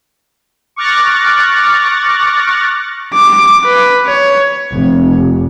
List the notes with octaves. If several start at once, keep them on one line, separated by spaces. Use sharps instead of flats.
C#6 D6 F6 F#6 A6 A#6
D6
B4
C#5
F1